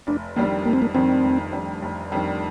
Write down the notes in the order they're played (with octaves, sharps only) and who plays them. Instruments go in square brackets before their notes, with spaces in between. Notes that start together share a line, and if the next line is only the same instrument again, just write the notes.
[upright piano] F1 [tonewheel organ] D4
[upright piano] F2 D#3 G3 D4 [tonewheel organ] A#3
[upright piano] F1 [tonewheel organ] A#3
[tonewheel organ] C4
A#3
[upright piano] F2 D#3 G3 D4 [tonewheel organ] C4
[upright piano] F1
F2 D#3 G3 D4
F1
F2 D#3 G3 D4